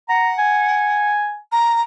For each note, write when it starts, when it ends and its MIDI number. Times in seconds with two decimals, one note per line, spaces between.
0.09 1.11 78
0.09 0.32 82
0.38 1.39 80
1.52 1.81 82